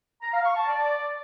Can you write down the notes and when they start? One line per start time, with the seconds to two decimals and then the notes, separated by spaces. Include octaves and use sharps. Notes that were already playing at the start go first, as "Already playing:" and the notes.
0.22 A#5
0.34 F5
0.45 C#6
0.56 A5
0.68 D5